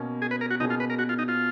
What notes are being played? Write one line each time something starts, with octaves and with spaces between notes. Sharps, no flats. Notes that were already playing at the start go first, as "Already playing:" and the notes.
Already playing: B2 A#3 C#4
G#4
B4
A#4
F#4
B2 A#3 C#4 D#4 G#4
F4
B4
A#4
F#4
F4
D#4
F4